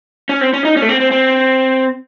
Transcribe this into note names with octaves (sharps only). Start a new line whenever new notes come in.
C#4
C4
C#4
D#4
C#4
A3
C4
C4
C4